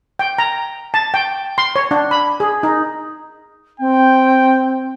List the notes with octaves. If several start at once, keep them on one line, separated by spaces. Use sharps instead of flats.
G5
A#5
A5
G5
C6
C#5
D4
B5
G#4
D#4
C4 G5